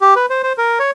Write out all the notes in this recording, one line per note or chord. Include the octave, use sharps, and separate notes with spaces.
G4
B4
C5
C5
A#4
C#5